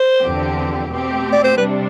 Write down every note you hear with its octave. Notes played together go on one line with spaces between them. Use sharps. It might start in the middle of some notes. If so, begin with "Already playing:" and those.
Already playing: C5
E2 D3 F3 C4 G4
B2 A3 C4 G4
D5
C5
C3 G3 D4 B4